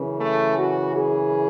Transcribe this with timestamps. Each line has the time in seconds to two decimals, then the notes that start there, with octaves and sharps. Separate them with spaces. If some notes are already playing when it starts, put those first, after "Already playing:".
Already playing: F#2 C#3 E3
0.19 A3
0.57 F#4
0.93 G#4